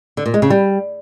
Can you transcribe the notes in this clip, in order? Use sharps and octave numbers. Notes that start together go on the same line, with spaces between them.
D3
A#2
G#3
C#3
G3